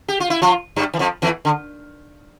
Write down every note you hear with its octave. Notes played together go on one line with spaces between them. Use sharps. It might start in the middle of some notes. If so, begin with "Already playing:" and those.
G4
F4
E4
F3 F4
G2 G3
E3
F2 F3
E2 E3
D3